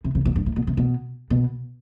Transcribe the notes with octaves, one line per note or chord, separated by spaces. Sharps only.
C3
C3
B2
G2
A2
B2
C3
B2
B2